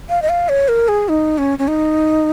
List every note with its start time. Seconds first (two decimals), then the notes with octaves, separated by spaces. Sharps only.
0.09 F5
0.22 D#5
0.29 F5
0.49 C#5
0.68 A#4
0.88 G#4
1.09 D#4
1.38 C#4
1.59 C#4
1.68 D#4